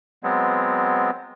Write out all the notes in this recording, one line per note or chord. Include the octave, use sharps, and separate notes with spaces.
F#3 G#3 B3 C4